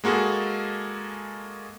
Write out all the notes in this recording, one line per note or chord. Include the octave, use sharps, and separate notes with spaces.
G#3 A#3 F#4 G#4 A4